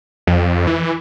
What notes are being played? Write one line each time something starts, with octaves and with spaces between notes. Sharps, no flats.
F2
E3